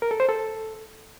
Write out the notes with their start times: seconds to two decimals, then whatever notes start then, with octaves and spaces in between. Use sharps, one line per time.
0.02 A#4
0.11 A4
0.20 C5
0.29 A4